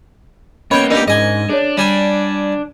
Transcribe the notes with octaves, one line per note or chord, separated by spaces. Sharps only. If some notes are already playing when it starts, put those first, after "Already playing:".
A#3 B3 C#4 C#5 D#5 G5 B5
D4 D#4 G4 A#4 D5
G#2 G#4 D#5 G#5
D4 G#4 C#5
G3 G#5